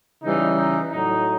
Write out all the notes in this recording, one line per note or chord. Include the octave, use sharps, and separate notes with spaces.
C#3 E3 G3 D#4
D#4
A2 F#3 D#4